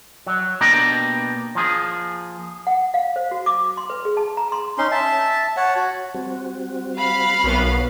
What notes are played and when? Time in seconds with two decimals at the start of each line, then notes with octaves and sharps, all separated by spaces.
0.27 F#3
0.61 B2 A#3 D4 G4 D#5 G5
1.55 F3 A#3 G#4
2.67 F#5
2.94 F5
3.16 C5
3.31 F#4
3.46 D6
3.77 C6
3.90 B4
4.05 G#4
4.17 A5
4.37 A#5
4.52 C6
4.78 C#4 D#4 C6
4.91 E5 A5
5.57 C#5 F#5 A5
5.76 F#4
6.14 G3 C4 F#4
6.98 F5 B5
7.44 B1 B3 A#4 C#5